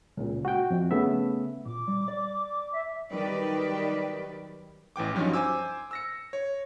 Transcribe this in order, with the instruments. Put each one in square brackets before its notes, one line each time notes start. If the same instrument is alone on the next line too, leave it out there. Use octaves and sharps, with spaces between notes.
[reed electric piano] C#2 A#2
F#4 G5
F2
C#3 A3 B3 E5
[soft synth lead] A#2 [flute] D6
[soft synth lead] G3
D5
[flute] E5
[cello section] D#3 F#3 G3 G4 B4 D5
[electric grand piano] A1 E3 G5 D6
G2 F3 F#3 C#4 D#4
C5 G#5 D6 E6
E6 A#6 C#7
C#5